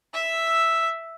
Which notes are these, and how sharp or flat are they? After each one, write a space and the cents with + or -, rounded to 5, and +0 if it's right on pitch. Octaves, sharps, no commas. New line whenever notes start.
E5 +0 E6 +0